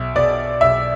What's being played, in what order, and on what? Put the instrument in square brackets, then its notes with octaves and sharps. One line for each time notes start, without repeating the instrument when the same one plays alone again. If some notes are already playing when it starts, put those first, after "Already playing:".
Already playing: [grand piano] B1 [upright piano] E5
[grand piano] B2 [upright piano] D5
[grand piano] B1 [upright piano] E5